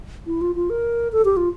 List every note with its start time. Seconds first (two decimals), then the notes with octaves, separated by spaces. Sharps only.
0.27 E4
0.41 F4
0.55 F4
0.70 A#4
1.13 A4
1.25 G4
1.37 F4